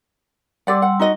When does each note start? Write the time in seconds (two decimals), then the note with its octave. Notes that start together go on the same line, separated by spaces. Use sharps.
0.67 G3 G4 D5 F#5 C6 E6
0.82 F#5
1.00 D#4 F#4 D#5